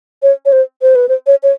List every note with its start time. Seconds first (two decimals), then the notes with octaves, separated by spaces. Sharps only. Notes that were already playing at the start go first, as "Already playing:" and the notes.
0.23 C#5
0.46 C#5
0.52 C5
0.82 C5
0.95 B4
1.09 C5
1.27 C#5
1.43 C#5